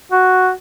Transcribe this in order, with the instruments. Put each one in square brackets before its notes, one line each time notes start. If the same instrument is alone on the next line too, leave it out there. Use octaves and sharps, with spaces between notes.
[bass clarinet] F#4